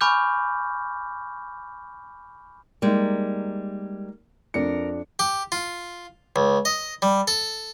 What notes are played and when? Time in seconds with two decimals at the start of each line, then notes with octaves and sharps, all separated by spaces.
0.01 G#5 B5 C#6 D6 F6 G6
2.82 G3 G#3 A#3 D#4
4.54 F2 D4 A#4 C#7
5.19 G4
5.52 F4
6.36 C#2
6.65 D#5
7.02 G3
7.28 A4